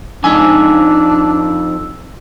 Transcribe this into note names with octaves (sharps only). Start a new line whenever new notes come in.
F2 D4 D#4 G#5 E6